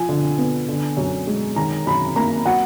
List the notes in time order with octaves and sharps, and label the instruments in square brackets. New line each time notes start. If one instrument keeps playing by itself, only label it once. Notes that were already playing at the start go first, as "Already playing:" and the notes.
Already playing: [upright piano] F3 G#5
D3
B3
D3
F#2
G#3
D#3 A#5
F#2 B5
A#3 A#5
F#3 F#5